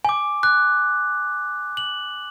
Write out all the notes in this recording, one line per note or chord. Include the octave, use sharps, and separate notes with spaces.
G#5 D6
D6 F#6
F#7